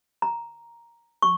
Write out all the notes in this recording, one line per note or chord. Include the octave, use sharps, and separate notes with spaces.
A#5
C#6